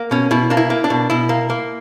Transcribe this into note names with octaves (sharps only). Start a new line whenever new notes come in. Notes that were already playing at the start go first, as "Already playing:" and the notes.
Already playing: A#3
B2 C#4
B2 E4
A#3 D4
E4
A#3
D4
B2
B2 E4
A#3
A#3